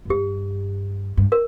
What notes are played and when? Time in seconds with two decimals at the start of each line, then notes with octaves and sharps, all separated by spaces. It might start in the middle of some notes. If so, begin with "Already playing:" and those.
0.05 F#2
0.09 G2 G4
1.17 G2
1.32 A#4